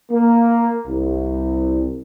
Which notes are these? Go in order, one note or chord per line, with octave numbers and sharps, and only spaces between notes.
A#3
C2